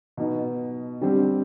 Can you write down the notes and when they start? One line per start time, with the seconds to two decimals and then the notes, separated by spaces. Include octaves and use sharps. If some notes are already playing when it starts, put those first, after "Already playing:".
0.17 B2 B3 D#4
1.01 D3 G3 C4